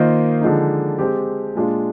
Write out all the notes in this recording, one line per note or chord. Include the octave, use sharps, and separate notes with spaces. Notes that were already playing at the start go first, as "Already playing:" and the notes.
Already playing: D#3 A#3 F4 C5 D#5
D3 F3 G#3 D#4
G#3 C4 G4
A#2 G#3 D4 F4